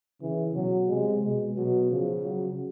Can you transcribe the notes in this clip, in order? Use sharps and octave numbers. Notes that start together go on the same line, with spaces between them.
C#3 E3
B2 F#3
C3 G#3
B2 G#3
B2 F#3
C#3 F3
F#3